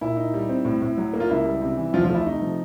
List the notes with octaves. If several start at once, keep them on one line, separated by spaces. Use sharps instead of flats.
A#2 E4
D#4
G3
C4
A2
A2
F#3
A#3
F4
C#2 E4
G3
C3
E3
E2 F3 F4
F3 F4
A3 E4
C3 D#4
F3